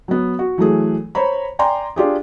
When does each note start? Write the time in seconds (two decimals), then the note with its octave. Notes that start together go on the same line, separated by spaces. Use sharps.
0.08 F#3 B3
0.39 F#4
0.58 E3 F#3 A3 G#4
1.15 C5 C#5 A#5 B5
1.59 D5 G5 G#5 A#5 C6
1.96 D4 F4 G4 G#4